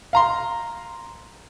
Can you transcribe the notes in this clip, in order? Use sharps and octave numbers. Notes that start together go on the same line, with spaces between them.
F5 A#5 C6